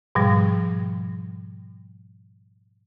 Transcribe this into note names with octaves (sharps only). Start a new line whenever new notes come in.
G#2 B2 F3 G3